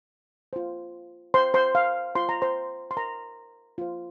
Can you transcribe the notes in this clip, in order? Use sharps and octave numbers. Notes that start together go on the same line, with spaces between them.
F4 C5
C5 C6
C5 C6
F5
F4 C5 C6
A#5
C5 C6
C6
A#4 A#5
F4 C5